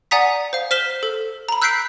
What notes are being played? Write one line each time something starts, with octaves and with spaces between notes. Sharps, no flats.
D5 F#5 G#5 A#5 D#6 B6
C5 F5
C5 F6 B6 E7 G7
A4
A#5 B5
E6 F#6 G6 B6 C7 D7